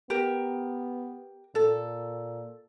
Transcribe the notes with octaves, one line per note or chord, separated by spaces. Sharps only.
B3 G4 A#4
A#2 A4